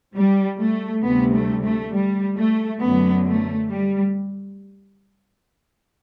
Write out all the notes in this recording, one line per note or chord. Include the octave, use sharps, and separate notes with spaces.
G3
A3
D2 C3 G3 B3
A3
A3
G3
A3
F#2 D3 F#3 B3
A3
G3